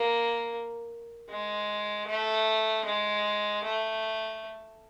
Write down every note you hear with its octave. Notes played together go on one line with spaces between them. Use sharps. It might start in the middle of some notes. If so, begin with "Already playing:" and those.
Already playing: A#3
G#3
A3
G#3
A3